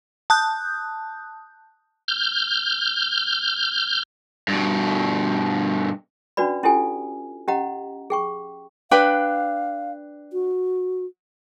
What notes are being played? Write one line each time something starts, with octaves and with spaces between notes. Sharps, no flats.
A5 D#6 F#6 G6
F6 G6
G2 B2
C#4 D4 F#4 B4 D5 B5
C#4 E4 F4 G4 A4 G#5
C#4 G4 D#5 F#5 A#5
G#4 G5 C#6
D4 B4 F5 G5
F#4